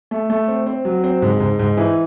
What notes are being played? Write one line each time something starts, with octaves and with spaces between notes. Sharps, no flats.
A3
A3
C4
C4
F#3
C4
G#2
G#2
G#2
E3